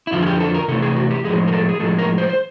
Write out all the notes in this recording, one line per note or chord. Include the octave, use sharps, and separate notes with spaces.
E4
F2 D3 F3 F4
G#4
G4
A4
A#4
C3 E3 A3 A4
G#4
F#4
G4
A2 F3 G#3 G#4
A#4
A4
G#4
A2 F3 G#3 A4
A#4
C5
C5